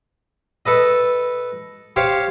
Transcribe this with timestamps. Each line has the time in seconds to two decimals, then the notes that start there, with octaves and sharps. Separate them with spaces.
0.66 A4 B4 D#5
1.96 G4 C5 C#5 F5